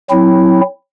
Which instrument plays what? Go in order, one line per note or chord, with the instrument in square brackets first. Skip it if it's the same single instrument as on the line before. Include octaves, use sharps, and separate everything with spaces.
[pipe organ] F#3 C4 E4